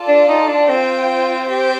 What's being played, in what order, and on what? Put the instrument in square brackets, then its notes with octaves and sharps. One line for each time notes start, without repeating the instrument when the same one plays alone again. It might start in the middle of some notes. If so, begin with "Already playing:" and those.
Already playing: [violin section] F4 A4 D5 A5
[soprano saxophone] D4
D#4
D4
[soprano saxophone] C4 [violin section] F4 C5 G5
[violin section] G4 C5 G5